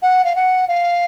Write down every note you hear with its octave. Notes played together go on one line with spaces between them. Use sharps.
F#5
F5
F#5
F5